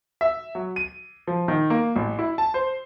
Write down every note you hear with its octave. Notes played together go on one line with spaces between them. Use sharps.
E5
F#3
D#7
F3
D#3
A#3
A1
E4
A5
C5